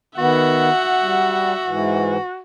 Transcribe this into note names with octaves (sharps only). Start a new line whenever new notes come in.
D#3 B3 F#4 E5 F#5
G3
G#2 E3